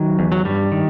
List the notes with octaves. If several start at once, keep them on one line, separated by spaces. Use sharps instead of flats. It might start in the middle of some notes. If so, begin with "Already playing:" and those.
Already playing: D#3 F#3
E2
F#3
G2 G3
D#3